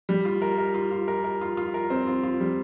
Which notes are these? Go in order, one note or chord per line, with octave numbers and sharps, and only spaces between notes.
G3
F4
A#4
A#4
F4
F4
A#4
A#4
F4
F4
A#4
C4
F4
F4
G3